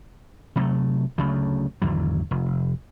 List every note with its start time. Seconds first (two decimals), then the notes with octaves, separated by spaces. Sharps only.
0.56 C3 F#3 A3
1.18 D2 C#3 F#3 A3
1.82 G#1 E2 D3 F#3
2.31 F1